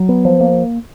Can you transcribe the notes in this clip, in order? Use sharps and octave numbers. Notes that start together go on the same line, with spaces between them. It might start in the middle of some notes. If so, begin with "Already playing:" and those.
Already playing: F#3
B3
F3
A#3